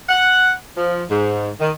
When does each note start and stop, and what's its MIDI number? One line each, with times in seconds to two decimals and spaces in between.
0.09 0.51 78
0.76 1.03 53
1.10 1.48 44
1.59 1.70 51